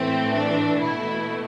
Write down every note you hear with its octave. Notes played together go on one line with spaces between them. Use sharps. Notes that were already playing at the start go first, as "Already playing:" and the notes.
Already playing: A2 E3 A3 C4
D4
B2 A3 E4